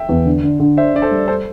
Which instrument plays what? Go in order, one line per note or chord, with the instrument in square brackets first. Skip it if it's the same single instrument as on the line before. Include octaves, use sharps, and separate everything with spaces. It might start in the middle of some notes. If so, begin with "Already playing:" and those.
Already playing: [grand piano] E5 G5
[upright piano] E2
D3
D3
D3
[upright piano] D4 [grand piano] C5 E5
[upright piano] D4 [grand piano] D5
[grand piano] A4 C5
[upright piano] G3
[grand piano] A4 C5